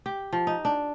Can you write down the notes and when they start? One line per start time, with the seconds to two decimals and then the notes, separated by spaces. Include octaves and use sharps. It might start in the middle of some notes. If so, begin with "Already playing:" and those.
0.06 G4
0.33 F3
0.47 D#4
0.65 D4